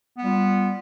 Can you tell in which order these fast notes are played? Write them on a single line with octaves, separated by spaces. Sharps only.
B3 G3 F4